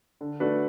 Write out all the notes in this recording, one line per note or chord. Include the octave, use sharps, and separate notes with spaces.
D3
A3 D4 F#4 B4